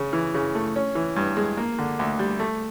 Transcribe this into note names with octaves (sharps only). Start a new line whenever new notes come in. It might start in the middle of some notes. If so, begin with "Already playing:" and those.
Already playing: C#3
E3
C#3
A3
C#4
E3
G2
G#3
A#3
D3
D2
G3
A3